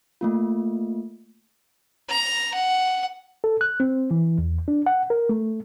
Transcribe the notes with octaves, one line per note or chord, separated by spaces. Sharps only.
A3 A#3 F4
A#5
F#5
A4
F#6
C4
E3
E2
D4
F#5
A#4
A3